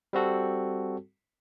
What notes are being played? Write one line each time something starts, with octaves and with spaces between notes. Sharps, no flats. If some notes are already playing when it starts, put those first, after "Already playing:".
G3 C4 F#4 A4